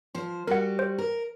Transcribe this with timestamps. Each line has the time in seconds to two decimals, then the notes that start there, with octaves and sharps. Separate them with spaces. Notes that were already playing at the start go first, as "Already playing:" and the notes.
0.15 F3 C5
0.47 G3 F#4 A#4 F#5
0.79 C5
0.98 A#4